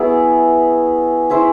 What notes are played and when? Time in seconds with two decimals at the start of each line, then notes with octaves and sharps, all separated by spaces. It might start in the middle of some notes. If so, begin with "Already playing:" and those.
Already playing: F#3 B3 E4 G#4
1.30 C#4 E4 G#4 C5